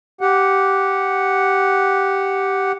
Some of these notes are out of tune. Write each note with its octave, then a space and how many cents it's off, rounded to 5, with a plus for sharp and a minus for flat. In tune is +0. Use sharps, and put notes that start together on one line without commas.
G4 -10 F#5 +0